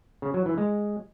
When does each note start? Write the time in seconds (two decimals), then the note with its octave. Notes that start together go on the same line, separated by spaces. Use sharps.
0.22 C#3
0.34 F#3
0.46 E3
0.58 G#3